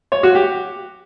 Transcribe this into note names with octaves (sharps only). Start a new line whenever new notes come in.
C#5
F#4
G4